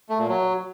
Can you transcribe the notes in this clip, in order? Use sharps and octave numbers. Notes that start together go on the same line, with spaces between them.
A3
A#2
F#3